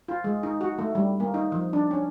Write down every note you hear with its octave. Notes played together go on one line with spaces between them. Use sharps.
F4
G#3
D#4
F#4
A3
G3
A#3
D#4
F3
D4
C#4